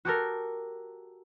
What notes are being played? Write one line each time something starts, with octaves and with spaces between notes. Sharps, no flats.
F#4 G4 A4 A#4